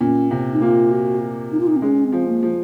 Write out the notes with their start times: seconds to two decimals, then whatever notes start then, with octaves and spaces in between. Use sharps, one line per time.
0.01 A#2 C#4
0.31 C3
0.53 D#4
0.61 A#3 F4
0.91 F#4
1.52 D#4
1.60 F4
1.67 D#4
1.76 C4
1.82 G#3 C#4
2.04 C4
2.12 F3
2.28 A#3
2.43 F3